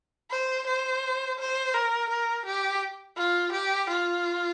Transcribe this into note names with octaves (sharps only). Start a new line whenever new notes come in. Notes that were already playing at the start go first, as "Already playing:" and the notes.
C5
C5
C5
A#4
A#4
G4
F4
G4
F4